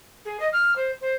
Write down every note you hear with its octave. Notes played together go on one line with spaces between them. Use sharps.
G#4
D#5
F6
C5
C5